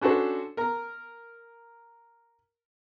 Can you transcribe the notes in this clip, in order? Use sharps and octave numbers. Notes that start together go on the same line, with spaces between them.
C#4 D4 F#4 A4 C5
A#4 A#5